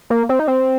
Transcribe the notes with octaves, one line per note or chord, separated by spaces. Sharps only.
A#3
C4
D#4
C4